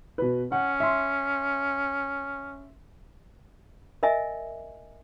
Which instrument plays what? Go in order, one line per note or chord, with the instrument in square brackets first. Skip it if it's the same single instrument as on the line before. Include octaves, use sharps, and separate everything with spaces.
[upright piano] B2 B4
[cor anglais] C#4 [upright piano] F#5
[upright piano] E5 C6
[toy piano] A#4 D#5 E5 G#5